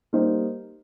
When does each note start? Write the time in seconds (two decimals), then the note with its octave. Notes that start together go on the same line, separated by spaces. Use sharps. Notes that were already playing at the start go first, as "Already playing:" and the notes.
0.13 G3 A#3 D#4 G4 C5